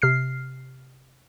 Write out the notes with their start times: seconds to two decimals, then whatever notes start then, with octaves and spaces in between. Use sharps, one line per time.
0.02 C3 F6 C7